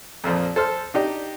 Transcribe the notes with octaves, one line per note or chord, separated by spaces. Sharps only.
F2 A#2 F3
A4 C5 F6
D4 D#4 G4